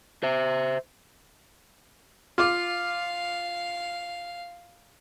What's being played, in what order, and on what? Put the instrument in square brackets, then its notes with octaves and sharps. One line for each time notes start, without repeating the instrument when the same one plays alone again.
[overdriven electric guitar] C5 E5
[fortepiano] F4 D6 [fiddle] F5